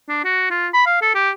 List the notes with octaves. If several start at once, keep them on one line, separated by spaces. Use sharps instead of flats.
D4
F#4
F4
B5
F5
A4
G4